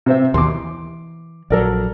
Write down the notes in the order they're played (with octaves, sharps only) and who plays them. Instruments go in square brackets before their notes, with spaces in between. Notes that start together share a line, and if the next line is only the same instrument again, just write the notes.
[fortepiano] C3 C5 E5
[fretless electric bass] D#2 B2 E3 [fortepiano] C6 D6
[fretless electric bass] E3
[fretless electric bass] A#1 F#3 [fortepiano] A4 A#4 D5